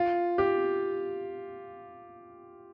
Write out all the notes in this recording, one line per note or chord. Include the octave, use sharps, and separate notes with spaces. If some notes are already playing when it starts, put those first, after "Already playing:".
Already playing: F4
G4